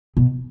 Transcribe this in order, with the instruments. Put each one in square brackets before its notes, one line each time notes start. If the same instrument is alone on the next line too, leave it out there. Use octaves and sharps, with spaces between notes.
[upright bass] B2